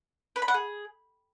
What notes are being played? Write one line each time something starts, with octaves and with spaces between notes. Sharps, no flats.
B4
B5
F#5
G#4